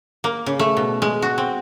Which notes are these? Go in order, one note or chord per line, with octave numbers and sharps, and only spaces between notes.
A#3
C#3
A3
B2
G#3
F#4
C4